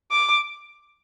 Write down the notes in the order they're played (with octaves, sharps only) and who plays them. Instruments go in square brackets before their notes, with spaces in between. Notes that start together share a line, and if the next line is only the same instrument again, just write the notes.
[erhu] D6